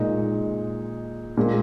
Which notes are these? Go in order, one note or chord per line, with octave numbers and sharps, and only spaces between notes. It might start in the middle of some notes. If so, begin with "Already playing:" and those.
Already playing: A#2 G#3 D#4
A#2 G#3